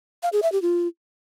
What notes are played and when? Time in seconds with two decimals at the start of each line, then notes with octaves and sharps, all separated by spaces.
0.23 F5
0.33 G#4
0.42 E5
0.52 G4
0.62 F4